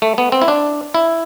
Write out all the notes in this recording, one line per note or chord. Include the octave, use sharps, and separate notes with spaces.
A3
B3
C4
E4
D4
E4